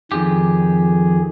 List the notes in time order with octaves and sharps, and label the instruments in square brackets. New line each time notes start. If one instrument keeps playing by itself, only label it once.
[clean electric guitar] F2 G4 [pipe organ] D#3 G#4